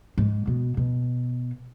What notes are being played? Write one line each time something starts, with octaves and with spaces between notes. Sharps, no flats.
G#2
B2
B2